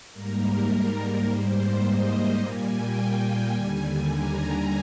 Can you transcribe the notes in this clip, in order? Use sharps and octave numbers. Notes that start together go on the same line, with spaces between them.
G#2 G3 A#3 A#4
G#2 G3 A#3 C5
D#5
A#2 G3 A#3 G#5
G5
G#5
D#2 D3 G3
A#5